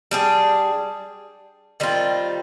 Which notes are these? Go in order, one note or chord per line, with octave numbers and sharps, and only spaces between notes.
G3 D4 G#4
D#3 G3 C4 F4